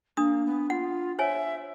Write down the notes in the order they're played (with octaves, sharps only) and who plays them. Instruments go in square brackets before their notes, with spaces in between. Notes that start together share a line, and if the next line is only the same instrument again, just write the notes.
[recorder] A#3 [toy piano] D4 D#6
[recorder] B3
[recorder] F4 [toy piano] F#5
[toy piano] C5 C#5 G#5 [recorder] E5